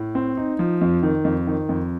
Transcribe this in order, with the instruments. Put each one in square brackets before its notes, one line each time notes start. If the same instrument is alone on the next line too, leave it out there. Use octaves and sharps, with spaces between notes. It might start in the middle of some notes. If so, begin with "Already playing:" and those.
Already playing: [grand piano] A2
C4
D#4
F3
F2
D#3
F2
D#3
F2